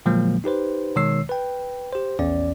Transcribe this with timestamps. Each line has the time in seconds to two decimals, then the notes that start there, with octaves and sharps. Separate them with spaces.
0.06 A#2 D3 F3 F#3 G#3 A#3
0.44 D#4 G4 B4 C5
0.96 B2 D#3 G#3 C#5 E6 C7
1.29 B4 G5
1.92 G4 C5
2.19 A#1 E2 C#4 D5